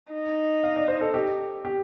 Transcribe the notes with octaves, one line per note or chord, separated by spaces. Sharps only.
D#4
F5
D5
C5
A4
G4
G4